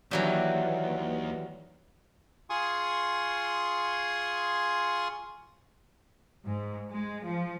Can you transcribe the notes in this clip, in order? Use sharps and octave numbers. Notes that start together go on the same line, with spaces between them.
D#2 D#3 E3 F#3 G3
F4 G#4 G#5 C6 C#6 D#6
G#2
G#3
F3